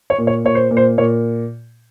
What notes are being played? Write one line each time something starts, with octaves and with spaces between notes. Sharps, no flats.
C#5
A#2
C#5
A#2 C#5
C5
A#2
C5
A#2 C#5